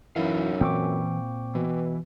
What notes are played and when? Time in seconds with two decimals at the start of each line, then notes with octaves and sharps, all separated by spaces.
0.16 F#2 E3 F#3 D#4 E4 F#4 F5
0.61 A#2 E3 C4 G5 C#6 D6
1.55 B2 E3